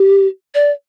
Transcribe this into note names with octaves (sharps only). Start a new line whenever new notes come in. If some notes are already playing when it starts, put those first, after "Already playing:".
Already playing: G4
D5